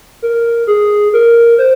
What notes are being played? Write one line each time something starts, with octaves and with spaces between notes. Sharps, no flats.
A#4
G#4
A#4
C5